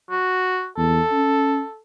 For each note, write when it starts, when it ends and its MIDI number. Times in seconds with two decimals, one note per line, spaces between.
0.10 0.67 66
0.77 1.00 40
0.77 1.80 69
1.12 1.61 61